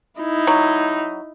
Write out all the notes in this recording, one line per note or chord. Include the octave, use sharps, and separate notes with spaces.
D#4 E4
F#3